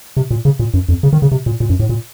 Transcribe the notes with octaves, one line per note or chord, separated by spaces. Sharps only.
C3
A#2
C#3
A#2
F#2
F2
C#3
D#3
C#3
C3
A#2
A#2
F#2
A2
A#2